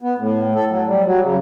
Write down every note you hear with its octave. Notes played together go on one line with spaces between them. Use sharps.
B3
A2
A4
F#3
G3
F#3
C#3